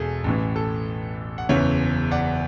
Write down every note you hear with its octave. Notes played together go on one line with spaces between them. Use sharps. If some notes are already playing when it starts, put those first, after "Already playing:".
Already playing: E1 E2 G#4 A4
A1 A2 E3
A4
F#5
F#1 E2 C#3 E3 C#5 E5
D5 F#5